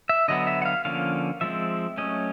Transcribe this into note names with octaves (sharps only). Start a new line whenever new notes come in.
E5
D3 F#3 B3 D#5
E5
F#5
F5
D3 F3 A#3 C#4 F5
F3 G#3 C4 E5
F#3 A3 C#4 D#5